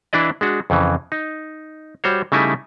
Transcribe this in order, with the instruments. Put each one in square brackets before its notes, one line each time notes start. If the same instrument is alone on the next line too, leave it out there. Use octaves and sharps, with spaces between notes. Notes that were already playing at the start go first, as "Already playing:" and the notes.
[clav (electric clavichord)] E3 D4 E4 D5 D#5
G#3 D4 F#4
F2 C#3 E3
D#4
G3 F#4 C5 C#5
C#3 G3 A3 D#4 E4 G#5